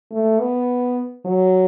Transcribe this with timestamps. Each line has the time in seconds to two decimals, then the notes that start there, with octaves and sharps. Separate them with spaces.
0.11 A3
0.40 B3
1.26 F#3